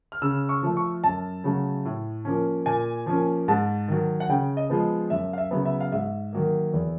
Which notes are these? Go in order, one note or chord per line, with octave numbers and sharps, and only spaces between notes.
F6
C#3 E6
C#6
F3 A3
C#6
F#2 A5
C#3 F#3 A3
A2
F3 A#3 C#4
A#2 G#5
F3 A#3 C#4
G#2 A5
D#3 F#3
F#5
C#3 G5
D#5
F3 G#3 B3
F#2 E5
F5
E5
C#3 F#3 B3
E5
F5
G#2 E5
D#3 F#3 A#3
E2